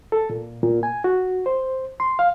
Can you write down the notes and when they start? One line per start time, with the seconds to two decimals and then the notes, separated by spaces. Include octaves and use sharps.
0.12 A4
0.30 A#2
0.63 A#2
0.83 G#5
1.04 F#4
1.46 C5
2.00 C6
2.19 F5